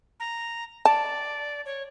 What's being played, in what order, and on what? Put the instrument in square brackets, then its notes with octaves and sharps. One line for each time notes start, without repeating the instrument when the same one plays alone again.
[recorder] A#5
[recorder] D5 [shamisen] A5
[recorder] C#5